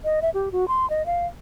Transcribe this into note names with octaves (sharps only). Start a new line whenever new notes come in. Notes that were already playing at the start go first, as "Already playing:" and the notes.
D#5
E5
G4
F#4
C6
D#5
F5